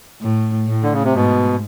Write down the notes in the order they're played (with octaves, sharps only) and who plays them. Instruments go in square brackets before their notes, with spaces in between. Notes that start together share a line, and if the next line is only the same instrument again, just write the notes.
[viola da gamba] A2
A2
[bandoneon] D3
C#3
C3
[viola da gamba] G#2 [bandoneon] B2